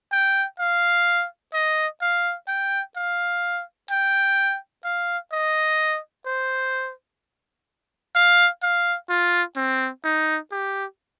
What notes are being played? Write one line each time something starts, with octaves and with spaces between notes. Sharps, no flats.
G5
F5
D#5
F5
G5
F5
G5
F5
D#5
C5
F5
F5
F4
C4
D#4
G4